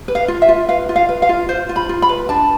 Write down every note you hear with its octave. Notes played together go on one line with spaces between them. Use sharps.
B4
F5
F4
E5
F4
B4 F5
F4
F5
B4
F5
F4
F4 C5
F4
B5
F4
B5
B4
D4 A5